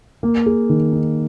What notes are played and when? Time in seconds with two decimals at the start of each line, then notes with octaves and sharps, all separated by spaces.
0.23 A#3
0.46 G#4
0.69 D#3
0.93 D#4